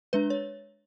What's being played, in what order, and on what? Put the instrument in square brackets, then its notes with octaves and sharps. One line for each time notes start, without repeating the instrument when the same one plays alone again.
[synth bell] G#3 D4 B4
C#5